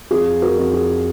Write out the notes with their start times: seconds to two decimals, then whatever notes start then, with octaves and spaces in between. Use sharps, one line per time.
0.10 F2 F4 G#4
0.42 F#4 A#4
0.58 F2
0.74 F4 G#4